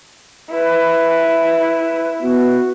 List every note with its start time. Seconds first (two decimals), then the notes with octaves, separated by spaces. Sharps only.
0.51 E4 B4
2.22 B3 F#4